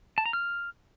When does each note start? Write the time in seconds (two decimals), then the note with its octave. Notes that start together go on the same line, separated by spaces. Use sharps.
0.18 A5
0.26 A#5
0.33 F6